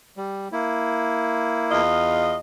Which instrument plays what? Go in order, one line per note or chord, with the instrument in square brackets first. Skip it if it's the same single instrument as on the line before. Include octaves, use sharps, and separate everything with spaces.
[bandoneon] G3
A#3 E4
[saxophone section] E2 F4 D#5